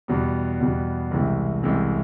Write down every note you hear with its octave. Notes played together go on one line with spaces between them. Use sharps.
E2 B2 G3 B3
E2 B2 G3 B3
C2 C3 E3 G#3
C2 C3 E3 G#3